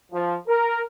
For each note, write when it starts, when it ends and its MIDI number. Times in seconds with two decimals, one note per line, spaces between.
0.12 0.35 53
0.48 0.80 70